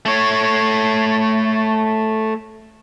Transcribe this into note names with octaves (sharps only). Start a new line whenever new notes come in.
A3 C#5